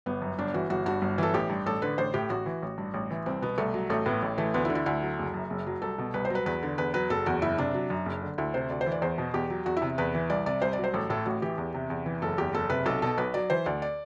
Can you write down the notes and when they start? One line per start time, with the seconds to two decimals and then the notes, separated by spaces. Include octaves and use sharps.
0.06 G1 B3
0.22 F#2
0.38 G1 D4
0.54 E3 F#4
0.70 G1 F#4
0.86 G2 F#4
1.02 G1
1.18 E3 A4
1.34 A1 G4
1.50 G2
1.66 A1 A4
1.82 D3 B4
1.98 A1 C5
2.14 A2 G4
2.30 A1 F#4
2.46 E3
2.62 A1
2.78 G2
2.94 A1
3.10 E3
3.26 C2 C4
3.42 B2 B3
3.58 C2 A3
3.74 F#3
3.90 A1 A3
4.06 A2 B3
4.22 A1
4.38 E3 A3
4.54 D2 B3
4.65 E4
4.70 D3
4.75 E4
4.86 D2 E4
5.02 F#3
5.19 F#1
5.34 F#2
5.50 F#1
5.66 F#3
5.82 C2 A4
5.98 B2
6.14 C2 B4
6.25 C5
6.30 F#3
6.35 B4
6.46 E2 B4
6.63 D3
6.78 E2 B4
6.94 F#3 B4
7.10 F#1 A4
7.26 E2 F#4
7.42 F#1 E4
7.58 C3 D4
7.74 F#3
7.90 F#2
8.06 F#1
8.22 D3
8.38 D2 E4
8.54 C3 C5
8.70 D2 D5
8.81 C5
8.86 E3
8.92 D5
9.02 E2 C5
9.18 B2
9.34 E2 G4
9.50 F#3
9.66 E2 F#4
9.77 E4
9.82 C3
9.98 E2 B4
10.15 E3
10.30 C2 D5
10.46 C3 D5
10.62 C2 C5
10.73 D5
10.78 F#3
10.84 C5
10.94 A1 A4
11.10 A2 A4
11.26 A1 F#4
11.42 E3 G4
11.58 E2
11.74 C3
11.90 E2
12.06 E3
12.22 F#1 A4
12.38 E2 G4
12.54 F#1 A4
12.70 C3 B4
12.86 B1 A4
13.02 B2 A4
13.18 B1 B4
13.34 F#3 D5
13.50 E3 C5
13.66 D2 D5
13.82 D5